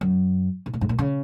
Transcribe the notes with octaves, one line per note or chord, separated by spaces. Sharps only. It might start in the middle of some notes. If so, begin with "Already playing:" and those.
F#2
B2
A#2
G#2
A#2
C#3